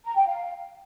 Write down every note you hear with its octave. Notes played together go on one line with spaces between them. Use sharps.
A#5
G5
F5